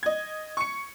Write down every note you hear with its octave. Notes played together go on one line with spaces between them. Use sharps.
D#5 G#6
C#6 C#7